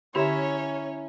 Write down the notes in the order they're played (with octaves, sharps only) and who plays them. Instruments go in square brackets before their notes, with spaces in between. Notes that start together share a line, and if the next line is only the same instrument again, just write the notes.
[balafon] D3 G4 [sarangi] C#4 [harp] E4 E5 A#5 [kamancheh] C#5